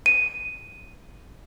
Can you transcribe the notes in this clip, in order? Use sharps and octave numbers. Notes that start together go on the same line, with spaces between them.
D#7